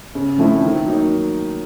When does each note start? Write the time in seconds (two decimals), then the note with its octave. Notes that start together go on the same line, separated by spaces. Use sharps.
0.15 C#3
0.38 F3 A3 C4 E4
0.62 D#3
0.86 F#3 A#3 D#4